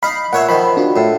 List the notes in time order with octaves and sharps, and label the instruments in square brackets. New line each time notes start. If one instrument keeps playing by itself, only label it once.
[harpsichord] D#4 F5 [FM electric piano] B5
[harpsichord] A#2 C#5 E5 [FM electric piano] F#5
[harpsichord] D#3 F3 [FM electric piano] B5
[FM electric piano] D4 F4 F#4
[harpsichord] A2